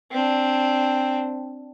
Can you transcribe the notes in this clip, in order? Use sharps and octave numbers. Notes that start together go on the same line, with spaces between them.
C4 D4